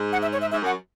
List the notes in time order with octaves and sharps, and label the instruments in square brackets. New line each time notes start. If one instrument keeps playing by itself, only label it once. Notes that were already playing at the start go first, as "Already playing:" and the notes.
Already playing: [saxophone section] G#2
[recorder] F#5
E5
C#5
E5
[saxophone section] G#2 [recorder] E5
[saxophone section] F#2 [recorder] F#5